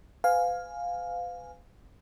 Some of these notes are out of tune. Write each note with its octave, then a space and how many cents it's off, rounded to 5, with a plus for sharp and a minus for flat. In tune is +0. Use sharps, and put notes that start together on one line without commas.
B4 +35 F5 +10 G#5 +0